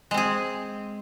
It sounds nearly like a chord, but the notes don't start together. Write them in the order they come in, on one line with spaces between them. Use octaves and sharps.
G#3 C4 G#4